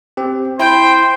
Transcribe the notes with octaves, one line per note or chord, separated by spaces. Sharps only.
C4 G4
E4 C5 G5 G6